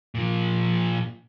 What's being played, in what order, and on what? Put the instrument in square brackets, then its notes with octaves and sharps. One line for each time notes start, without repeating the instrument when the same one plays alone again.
[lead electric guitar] A#2 F3